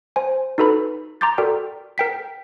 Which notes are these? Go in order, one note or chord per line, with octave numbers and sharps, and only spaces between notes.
C5 G#5
D#4 F#4 A4 B4 B5
A#5 C6 D6 G6 A6
F#4 A4 A#4 D5 G5
A#4 G5 B6